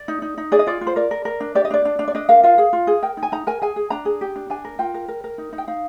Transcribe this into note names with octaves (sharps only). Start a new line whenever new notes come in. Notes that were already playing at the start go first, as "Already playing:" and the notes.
Already playing: D5
D#4
D#4
D#4
G#4 D5
D#5
F4 D5
F4
C5
A#4 D5
A#4
A#4
D4
G4 D5
D#5
D4 D5
D4
D4
D5
D4 D#5
A#4 F5
F4 F5
G#4
F4
G#4
A#4 G5
D#4
G#5
D#4 A#5
A#4 G#5
G#4 G#5
G#4
D4 A#5
G#4
G4
D4
D4 G#5
A#4
F4 G5
A#4
A#4
A#4
D#4
D#4
G5
D#4 F5